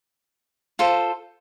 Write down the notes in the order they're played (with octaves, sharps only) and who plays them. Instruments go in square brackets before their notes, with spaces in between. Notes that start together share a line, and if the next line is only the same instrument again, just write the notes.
[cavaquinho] F4 A4 C5